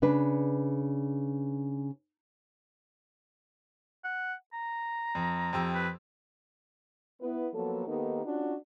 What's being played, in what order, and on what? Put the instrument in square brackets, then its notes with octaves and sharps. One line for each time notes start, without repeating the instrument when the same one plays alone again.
[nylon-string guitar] C#3 D4 B4
[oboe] F#5
A#5
[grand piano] F2
F2 G4 E6
[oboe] B4
[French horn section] B3 E4 B4
F3 F#3 A#3 B3 A4
D#3 A#3 B3 D#4 G4 A4
C#4 D4 F4 F#4